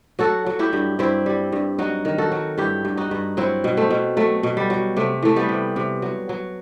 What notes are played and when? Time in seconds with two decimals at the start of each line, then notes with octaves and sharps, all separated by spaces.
0.19 F#3 F#4 A4
0.46 F#3
0.59 E4 G4
0.73 G2
0.99 G2 C4 E4
1.26 G3
1.52 G2
1.78 F#3 D#4 F#4
2.05 D#3
2.18 F#4 A4
2.32 F#3
2.58 G2 E4 G4
2.85 G2
2.97 D#4 F#4
3.11 G2
3.37 F#3 C4 E4
3.64 B2
3.77 A3 C4
3.91 B2
4.17 F#3 A3
4.43 B2
4.57 G3
4.70 F#3
4.96 C3 A3
5.23 E3 A3
5.36 G3 B3
5.49 C3
5.76 C3
6.02 F#3
6.29 F#3